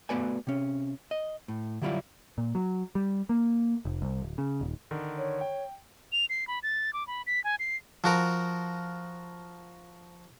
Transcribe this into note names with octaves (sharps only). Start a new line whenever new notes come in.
A3 B3 F#4 B4 D5 G#5
C3 C#4
D#5
A2
D3 F#3 G3 E4 F4 D5
A#2
F#3
G3
A#3
F1
C2
D1
C#3
D#1
D3 D#3
C#5
G5
F7
C7
B5
A6
D6
B5
B6
G#5
C7
F3 F#4 A#4